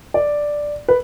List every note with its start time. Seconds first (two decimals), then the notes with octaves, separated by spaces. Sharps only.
0.14 D5
0.88 B4